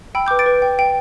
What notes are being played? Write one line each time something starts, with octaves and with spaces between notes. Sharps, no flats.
G5 B5 E6
B4 D6 G6
A6 D7
B4
G5
G5